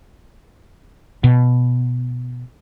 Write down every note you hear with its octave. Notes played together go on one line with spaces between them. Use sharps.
B2